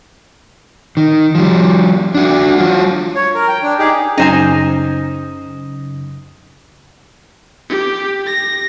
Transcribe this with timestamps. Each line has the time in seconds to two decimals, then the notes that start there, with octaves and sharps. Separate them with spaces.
0.97 D#3
1.35 F3 G3
2.15 D4 F#4
2.58 F#3 F4
3.16 C#5
3.34 A#4
3.48 G5
3.63 D4
3.79 D#4 G4 G#4
4.18 F#2 C#3 D#4 C5 G#5
7.69 G4
8.26 A#6